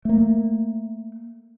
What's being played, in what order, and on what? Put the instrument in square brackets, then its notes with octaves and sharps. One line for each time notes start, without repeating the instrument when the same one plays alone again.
[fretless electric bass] A3 A#3